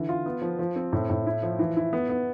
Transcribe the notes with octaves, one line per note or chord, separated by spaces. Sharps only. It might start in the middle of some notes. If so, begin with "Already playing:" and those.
Already playing: D3 E3
F4
B3
F3
F3
C4
A2
A2
E4
F3
E3
E4
B3
B3